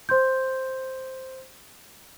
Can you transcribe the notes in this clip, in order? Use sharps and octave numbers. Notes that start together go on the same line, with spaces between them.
C5 C6 G6